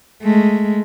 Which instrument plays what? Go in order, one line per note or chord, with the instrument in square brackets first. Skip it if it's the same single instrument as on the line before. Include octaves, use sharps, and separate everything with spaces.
[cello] G#3 A3